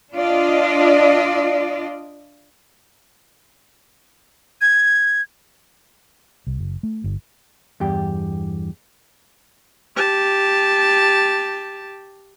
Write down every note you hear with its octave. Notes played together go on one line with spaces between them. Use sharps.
D4 F4 D5 D#5
G#6
C2
F#1
A3
G1
E2 G2 G4 G5
G4 A5